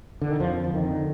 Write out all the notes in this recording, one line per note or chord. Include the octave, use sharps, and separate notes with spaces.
D3
D#3
F2 F3
D3
F3
F2 D#3
D3